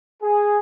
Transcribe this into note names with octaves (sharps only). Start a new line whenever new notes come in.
G#4